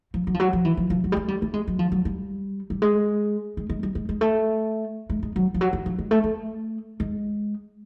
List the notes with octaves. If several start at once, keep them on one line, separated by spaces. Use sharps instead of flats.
F3
F#3
F3
F#3
F3
E3
F3
F3
F#3
G3
G#3
G3
A3
G#3
F#3
F3
F#3
G3
G3
G#3
G#3
G#3
G3
G#3
G#3
A3
G#3
G#3
F#3
F3
F#3
E3
F3
G#3
A3
A3
G#3